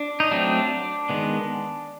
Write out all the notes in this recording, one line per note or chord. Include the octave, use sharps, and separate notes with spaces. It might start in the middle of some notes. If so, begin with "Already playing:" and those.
Already playing: D4
D#4
F#3 A3 C4 D4
D#3 G#3 B3